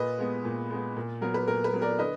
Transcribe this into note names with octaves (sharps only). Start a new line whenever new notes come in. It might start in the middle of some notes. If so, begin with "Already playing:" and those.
Already playing: A#2 B4 D#5
G#3 B3
A#2
G#3 B3
A#2
F#3 B3 A#4
B4
A#2 A#4
B4
F#3 B3
A#4 D5
D3 B4 D#5